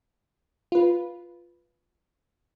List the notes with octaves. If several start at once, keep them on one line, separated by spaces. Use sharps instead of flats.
F4 B4